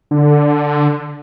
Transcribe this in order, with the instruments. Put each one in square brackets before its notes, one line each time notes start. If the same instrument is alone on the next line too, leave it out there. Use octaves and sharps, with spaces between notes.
[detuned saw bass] D3